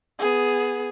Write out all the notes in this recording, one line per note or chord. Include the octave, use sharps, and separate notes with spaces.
B3 G#4